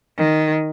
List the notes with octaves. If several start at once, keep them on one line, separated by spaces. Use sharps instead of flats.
D#3